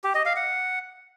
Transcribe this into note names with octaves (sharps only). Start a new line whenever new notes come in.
G4
D#5
F5
F#5